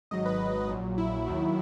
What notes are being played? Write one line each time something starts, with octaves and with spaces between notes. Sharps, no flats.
G#1 G#2 F#3 D#5
B4
A#1 A#2 F#3
E4
D#2 D#3 F#3